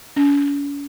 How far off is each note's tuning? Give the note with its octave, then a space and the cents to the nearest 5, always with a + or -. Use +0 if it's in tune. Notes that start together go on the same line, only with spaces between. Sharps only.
C#4 +45